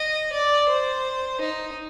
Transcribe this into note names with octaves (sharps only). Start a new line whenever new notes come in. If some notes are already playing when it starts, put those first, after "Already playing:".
Already playing: D#5
D5
C5
D#4